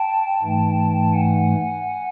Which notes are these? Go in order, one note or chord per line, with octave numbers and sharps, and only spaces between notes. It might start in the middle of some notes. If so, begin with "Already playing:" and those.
Already playing: G5 A5
G#2 E3 A3
F#5 G#5